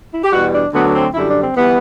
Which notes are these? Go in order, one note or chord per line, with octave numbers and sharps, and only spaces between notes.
E4
G4
E2 B2 G3 F#4
D4
D2 D3 F#3 B3
B3
C4
F#2 D3 G3 E4
D4
C4
E3 G3 B3